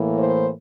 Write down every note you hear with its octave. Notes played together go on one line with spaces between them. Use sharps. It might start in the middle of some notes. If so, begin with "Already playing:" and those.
Already playing: A2 E3 A#3
C5